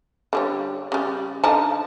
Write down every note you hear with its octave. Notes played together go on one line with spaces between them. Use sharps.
D3 G3 C#5
C#3 G3
D3 D#4 A5